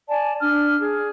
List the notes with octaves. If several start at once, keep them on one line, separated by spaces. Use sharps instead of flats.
D5 G#5 A5
D4 F6
G#4